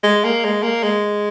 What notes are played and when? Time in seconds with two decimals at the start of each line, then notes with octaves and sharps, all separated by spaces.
0.03 G#3
0.24 A#3
0.44 G#3
0.63 A#3
0.83 G#3